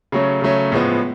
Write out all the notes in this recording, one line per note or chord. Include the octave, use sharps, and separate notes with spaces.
C#3 F#3 A3 C#4
C#3 F#3 A3 C#4
A2 F3 G#3 B3